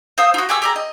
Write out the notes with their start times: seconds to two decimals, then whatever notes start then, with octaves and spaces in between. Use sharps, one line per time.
0.18 C5 F5 D#6 E6
0.34 F4 F#4
0.49 G4 G#4 C#6 E6
0.62 G4 G#4 A#5
0.76 D#5